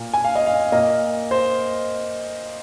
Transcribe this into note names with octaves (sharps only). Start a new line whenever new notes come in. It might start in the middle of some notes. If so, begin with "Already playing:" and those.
Already playing: A#2 A#3
G#5
F5
D#5
F5
A#2 A#3 D#5
C5